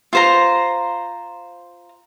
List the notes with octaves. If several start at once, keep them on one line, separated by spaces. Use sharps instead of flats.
F4 C5 A#5